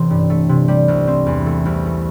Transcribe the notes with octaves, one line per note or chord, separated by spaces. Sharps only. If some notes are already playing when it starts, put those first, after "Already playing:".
Already playing: A1 C3 E3 C4
G2
A3
C3
G3
C2
C4
E2
A3
C2
A3